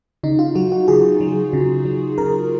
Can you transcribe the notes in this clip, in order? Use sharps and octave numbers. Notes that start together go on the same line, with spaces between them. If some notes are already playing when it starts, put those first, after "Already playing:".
C#3 D#4
F4
F#3 F#4
F#4
C#3 G#4
F#3
C#3
F#3
C#3 A#4